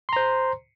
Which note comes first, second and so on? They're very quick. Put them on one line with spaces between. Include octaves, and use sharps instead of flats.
C6 A#5 C5